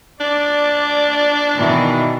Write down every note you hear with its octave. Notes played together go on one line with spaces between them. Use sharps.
D4 D5
B2 D#3 E3